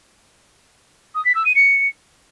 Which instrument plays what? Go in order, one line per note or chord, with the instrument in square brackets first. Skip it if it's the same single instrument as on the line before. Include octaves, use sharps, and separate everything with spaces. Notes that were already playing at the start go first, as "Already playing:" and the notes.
[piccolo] D#6
B6
E6
D#7
C#7